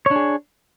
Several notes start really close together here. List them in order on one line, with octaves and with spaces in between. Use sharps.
C#5 D4 G#4